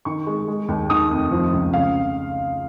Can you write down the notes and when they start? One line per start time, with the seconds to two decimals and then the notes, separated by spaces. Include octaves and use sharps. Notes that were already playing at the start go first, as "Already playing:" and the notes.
0.05 D#3 C#6
0.27 G#3
0.48 G#3
0.68 D#2
0.90 D#3 D#6
1.11 F1
1.32 F3
1.53 C#2
1.73 C#3 F5